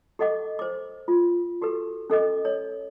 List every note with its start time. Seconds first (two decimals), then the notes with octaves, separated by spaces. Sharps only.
0.19 G4 A4 D#5 F#5 D6
0.59 C5 D6
1.08 F4
1.62 F#4 G4 A4 B4
2.10 C#4 A4 D#5 D6
2.45 C#5